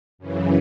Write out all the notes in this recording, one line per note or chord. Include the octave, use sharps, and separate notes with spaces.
F#2 C#3 E3